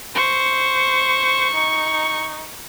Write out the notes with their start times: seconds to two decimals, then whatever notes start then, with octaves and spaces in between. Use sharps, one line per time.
0.15 C5 C#6
1.54 D#4